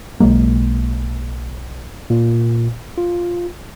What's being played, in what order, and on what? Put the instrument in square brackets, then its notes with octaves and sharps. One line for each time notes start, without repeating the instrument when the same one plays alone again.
[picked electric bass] B1 F#3 G#3 A#3
[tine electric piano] A#2
F4